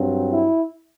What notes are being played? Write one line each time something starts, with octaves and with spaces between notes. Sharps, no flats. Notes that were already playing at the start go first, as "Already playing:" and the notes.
Already playing: G2 F#3 C4
E4